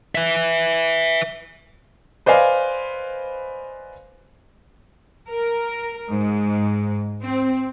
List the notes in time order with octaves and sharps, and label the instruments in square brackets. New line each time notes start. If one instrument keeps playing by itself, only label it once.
[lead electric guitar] B4 E5
[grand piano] B4 C5 D5 D#5 F5 G#5
[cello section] A#4
G#2
C4